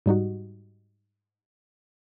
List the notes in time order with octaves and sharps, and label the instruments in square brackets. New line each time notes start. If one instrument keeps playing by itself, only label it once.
[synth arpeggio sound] G#2 G3 D#4 F#4